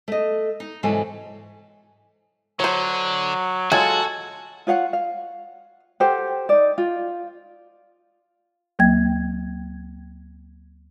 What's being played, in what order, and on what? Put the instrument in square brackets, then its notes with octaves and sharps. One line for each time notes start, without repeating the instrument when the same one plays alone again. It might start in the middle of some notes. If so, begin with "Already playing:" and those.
[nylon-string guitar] A3 D#5
D#4
G#2 C3 E3 F#3 A4 G#5
[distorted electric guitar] D3 [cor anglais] F#3 [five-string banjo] C5 C#5
[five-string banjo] F#3 G#3 F4 [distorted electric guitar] F#4 [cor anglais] A4 [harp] G#5
[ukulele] F4 C#5 F5 F#5
F5
G4 A4 C5 F#5
D#4 D5
F4
[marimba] D2 F#3 A#3 G5 G#6